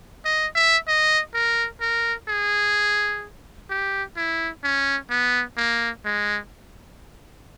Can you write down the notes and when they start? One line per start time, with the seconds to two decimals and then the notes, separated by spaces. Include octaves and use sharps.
0.25 D#5
0.55 E5
0.88 D#5
1.34 A#4
1.81 A#4
2.29 G#4
3.70 G4
4.16 E4
4.64 C#4
5.10 B3
5.57 A#3
6.05 G#3